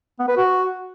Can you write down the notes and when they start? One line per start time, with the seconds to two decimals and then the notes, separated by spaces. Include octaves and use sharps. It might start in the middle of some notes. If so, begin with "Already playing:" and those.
0.19 B3
0.28 B4
0.37 F#4